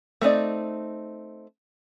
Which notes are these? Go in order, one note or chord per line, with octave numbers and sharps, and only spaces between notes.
A3 C4 D#4 D5